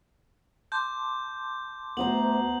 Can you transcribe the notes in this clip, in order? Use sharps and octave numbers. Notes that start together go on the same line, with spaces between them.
A5 C6 D6 G6
D2 B3 C5 A#5 F#7